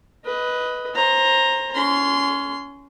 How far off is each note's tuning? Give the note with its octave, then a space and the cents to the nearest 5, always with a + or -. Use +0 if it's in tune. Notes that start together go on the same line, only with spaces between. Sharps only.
B4 +0 D#5 +15
C5 +25 A#5 +0
C#4 +20 C6 -15